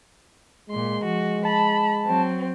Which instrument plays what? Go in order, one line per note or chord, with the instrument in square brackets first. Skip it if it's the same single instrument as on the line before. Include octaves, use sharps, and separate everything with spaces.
[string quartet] A#2 C6 [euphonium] G#3
[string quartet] F3 F#4
[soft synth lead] A5 [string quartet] B5
[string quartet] F#3 C4